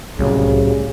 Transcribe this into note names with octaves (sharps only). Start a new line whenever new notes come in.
C2 A2 C#3 F#3 G3